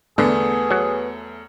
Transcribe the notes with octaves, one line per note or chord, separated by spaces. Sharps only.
E2 D3 A3 B3 G#4
F#3